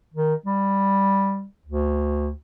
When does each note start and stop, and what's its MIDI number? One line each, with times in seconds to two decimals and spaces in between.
0.14 0.34 51
0.46 1.45 55
1.66 2.30 38